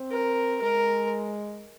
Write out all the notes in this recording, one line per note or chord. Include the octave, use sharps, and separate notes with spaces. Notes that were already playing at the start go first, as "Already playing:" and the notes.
Already playing: C4
A#4
G#3 A#4